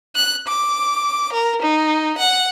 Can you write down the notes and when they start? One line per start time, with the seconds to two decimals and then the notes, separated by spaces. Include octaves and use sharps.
0.16 F#6
0.48 D6
1.33 A#4
1.62 D#4
2.18 F#5